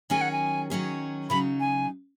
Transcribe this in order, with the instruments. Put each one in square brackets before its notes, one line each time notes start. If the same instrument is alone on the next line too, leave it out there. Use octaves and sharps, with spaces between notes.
[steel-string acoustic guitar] D#3 F#3 C#4 G#4 [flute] G#5
[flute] F#5
G#5
[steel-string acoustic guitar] D#3 F#3 C#4 G#4
[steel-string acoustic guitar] C#3 F#3 D#4 [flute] B5
[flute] G#5